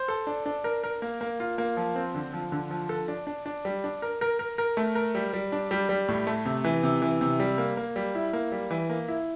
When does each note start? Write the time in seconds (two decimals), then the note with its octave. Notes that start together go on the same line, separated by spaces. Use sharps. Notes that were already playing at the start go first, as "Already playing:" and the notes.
Already playing: C5
0.08 A4
0.27 D4
0.46 D4
0.64 A#4
0.83 A#4
1.02 A#3
1.21 A#3
1.40 F4
1.58 A#3
1.77 F3
1.95 C4
2.15 D3
2.33 F3
2.52 D3
2.71 F3
2.89 A4
3.08 D4
3.27 D4
3.46 D4
3.65 G3
3.84 D4
4.02 A#4
4.21 A#4
4.39 A#4
4.58 A#4
4.77 A3
4.95 A#4
5.15 G3
5.33 G3
5.52 D4
5.71 G3
5.89 G3
6.08 A2
6.27 A3
6.45 C3
6.64 E3
6.83 C3
7.02 E3
7.21 C3
7.40 G3
7.58 A#3
7.77 A#3
7.96 G3
8.15 E4
8.33 A#3
8.52 G3
8.71 E3
8.90 A#3
9.08 E4